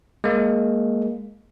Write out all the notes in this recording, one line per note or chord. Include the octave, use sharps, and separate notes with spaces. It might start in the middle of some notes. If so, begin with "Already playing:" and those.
G#3 A#3